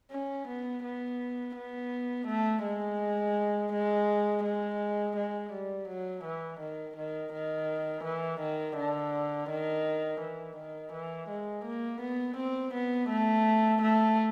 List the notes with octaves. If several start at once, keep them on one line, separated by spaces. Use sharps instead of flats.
C#4
B3
B3
B3
A3
G#3
G#3
G#3
G#3
G3
F#3
E3
D#3
D#3
D#3
E3
D#3
D3
D#3
E3
D#3
E3
G#3
A#3
B3
C4
B3
A3
A3